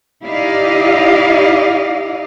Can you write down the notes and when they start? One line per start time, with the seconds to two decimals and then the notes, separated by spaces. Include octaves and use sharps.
0.24 D#4 E4 G4 D5 D#5 F5